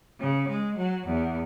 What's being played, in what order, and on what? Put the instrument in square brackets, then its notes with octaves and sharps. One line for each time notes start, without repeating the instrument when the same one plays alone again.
[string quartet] C#3
G#3
F#3
E2